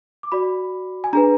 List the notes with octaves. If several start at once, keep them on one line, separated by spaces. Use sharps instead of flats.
D6
F#4 D5 B5
G#5
D4 G#4 B4 A#5